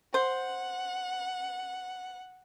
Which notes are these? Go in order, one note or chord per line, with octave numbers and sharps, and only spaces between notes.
C5 F#5